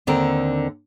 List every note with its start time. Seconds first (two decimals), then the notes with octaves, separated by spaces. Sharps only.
0.07 D#2 D3 C4 A#4